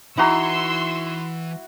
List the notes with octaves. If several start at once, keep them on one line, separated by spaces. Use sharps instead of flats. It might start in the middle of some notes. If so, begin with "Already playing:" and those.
E3 D#4 E4 F#4 A#5 C6 C#6 E6